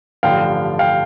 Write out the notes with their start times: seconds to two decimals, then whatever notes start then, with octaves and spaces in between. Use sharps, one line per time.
0.23 A1 G2 D3 F3 F5 G5
0.79 F5 G5